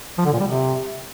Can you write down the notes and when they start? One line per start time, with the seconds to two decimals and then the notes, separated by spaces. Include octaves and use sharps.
0.18 F3
0.26 D3
0.33 A#2
0.40 G3
0.48 C3